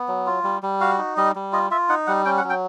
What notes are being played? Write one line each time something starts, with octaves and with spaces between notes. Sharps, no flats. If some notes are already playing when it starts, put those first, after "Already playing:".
Already playing: B3
F#3
F4
G3
G3
F#4 F5
D#4
G3 D#5
G3
F4 D#5
F4 E5
D#4 F#5
G3 F#5
C#4 G5
F#5
F#3
G5